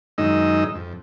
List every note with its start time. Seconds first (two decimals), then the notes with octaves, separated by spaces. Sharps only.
0.18 F#2 D#3 G#3 D#4 D#5 E6
0.75 F2